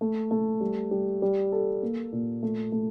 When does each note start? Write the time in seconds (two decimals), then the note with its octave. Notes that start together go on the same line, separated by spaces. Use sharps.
0.01 A3
0.31 A3
0.61 G3
0.91 G3
1.22 G3
1.52 A4
1.82 A#3
2.12 A#2
2.43 A3
2.72 A3